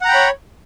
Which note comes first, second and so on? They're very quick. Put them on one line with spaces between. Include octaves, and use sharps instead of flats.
F#5 A#5 G5 B5 C#5